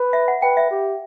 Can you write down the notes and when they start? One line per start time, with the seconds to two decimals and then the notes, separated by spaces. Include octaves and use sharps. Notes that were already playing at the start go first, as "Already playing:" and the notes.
Already playing: B4
0.13 E5
0.28 F#5
0.42 B4 G5
0.57 E5
0.71 G4